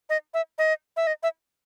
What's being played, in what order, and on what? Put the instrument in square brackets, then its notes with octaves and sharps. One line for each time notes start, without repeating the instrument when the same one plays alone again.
[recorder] D#5
E5
D#5
E5
D#5
E5